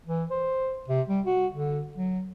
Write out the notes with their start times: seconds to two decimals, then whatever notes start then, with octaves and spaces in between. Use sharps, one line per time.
0.06 E3
0.31 C5
0.88 C3
1.09 G3
1.26 F#4
1.52 D3
1.97 F#3